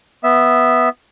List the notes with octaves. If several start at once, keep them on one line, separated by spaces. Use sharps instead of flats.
B3 E5